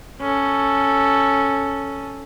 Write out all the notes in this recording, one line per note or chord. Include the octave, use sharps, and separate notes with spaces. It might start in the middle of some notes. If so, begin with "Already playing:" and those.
C#4 A4